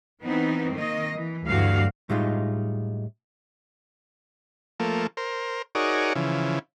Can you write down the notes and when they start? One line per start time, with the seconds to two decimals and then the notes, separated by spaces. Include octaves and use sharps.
0.22 E3 B3 C4 D#4
0.72 D#3 A#3 D#5
1.16 E3
1.46 D2 G2 E3 F#3 F#4 F5
2.10 A2 G3 G#3 D#4 F4
4.80 F3 A3 A#3
5.17 A#4 C5
5.75 D#4 F#4 G#4 A#4 C#5 D5
6.15 C#3 E3 F3